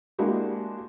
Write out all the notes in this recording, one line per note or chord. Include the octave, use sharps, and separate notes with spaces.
G#3 A#3 D4 E4 F#4 G4